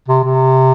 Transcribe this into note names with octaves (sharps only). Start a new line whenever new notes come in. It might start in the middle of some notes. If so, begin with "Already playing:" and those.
C3
C3